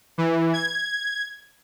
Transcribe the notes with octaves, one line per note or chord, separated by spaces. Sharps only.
E3
G#6